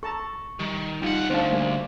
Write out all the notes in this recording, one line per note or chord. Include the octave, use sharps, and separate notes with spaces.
A4 A5 A#5 C#6
D#3 G3
C2 G3 D#4 F4 F#5 G5
D2 C4 D4 C5 F5 A5
G3 A#3 G#5